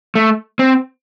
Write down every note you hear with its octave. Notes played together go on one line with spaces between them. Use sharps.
A3
C4